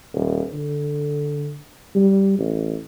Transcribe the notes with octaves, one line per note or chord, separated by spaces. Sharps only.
D#1
D3
G3
A1